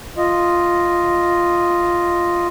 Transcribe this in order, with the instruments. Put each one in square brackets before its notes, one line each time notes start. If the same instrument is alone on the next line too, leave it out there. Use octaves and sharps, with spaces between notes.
[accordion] F4 D#5